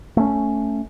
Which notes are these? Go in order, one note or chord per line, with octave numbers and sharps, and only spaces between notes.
A3 C#4